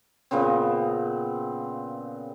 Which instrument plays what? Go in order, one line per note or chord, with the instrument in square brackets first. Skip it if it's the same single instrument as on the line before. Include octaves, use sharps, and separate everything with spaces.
[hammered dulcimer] A#2 C#3 B3 C4